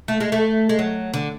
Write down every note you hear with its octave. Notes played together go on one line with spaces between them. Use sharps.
A3
G#3
A3
G#3
F#3
D3